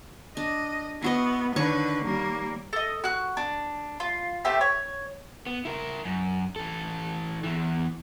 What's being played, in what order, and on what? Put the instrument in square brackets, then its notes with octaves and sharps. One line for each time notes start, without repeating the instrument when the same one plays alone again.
[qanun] D4 [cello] D#5
[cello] B3 [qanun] E4 F#4 D#5
[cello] D3 B4 [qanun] D#3 C#5 C#6
[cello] G3 A#3
[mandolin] A4 D#5
F#4 F#6
D4
F4
A3 C4 G4 E5
C#5
[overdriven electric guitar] B3
E4 A#4
F#2
E3 A4
E2 E3